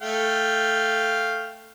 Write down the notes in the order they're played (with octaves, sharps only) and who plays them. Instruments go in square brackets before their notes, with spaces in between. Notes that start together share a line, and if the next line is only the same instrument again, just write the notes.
[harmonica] A3 F5 G5